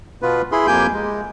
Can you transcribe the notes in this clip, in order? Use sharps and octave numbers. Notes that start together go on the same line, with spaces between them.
B2 B3 F4 B4
E4 G#4 B5 C6
F2 A#3 G4 G5 G#5 G6
G#3